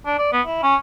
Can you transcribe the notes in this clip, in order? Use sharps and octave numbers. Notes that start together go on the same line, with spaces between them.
D4
D5
B3
E4
C#4